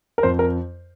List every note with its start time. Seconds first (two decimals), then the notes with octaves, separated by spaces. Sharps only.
0.18 A#4
0.23 F2 C5
0.39 A#4